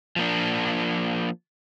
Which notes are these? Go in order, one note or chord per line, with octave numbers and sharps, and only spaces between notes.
F3 A#3 D4